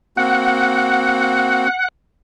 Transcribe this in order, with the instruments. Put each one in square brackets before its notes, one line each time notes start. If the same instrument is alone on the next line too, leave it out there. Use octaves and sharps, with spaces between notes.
[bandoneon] A#3 C4 F#4 [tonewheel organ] F#5